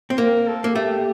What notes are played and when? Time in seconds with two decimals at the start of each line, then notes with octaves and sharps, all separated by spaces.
0.10 C4
0.18 A#3 A#4
0.47 A4
0.64 A#3
0.75 A3 G4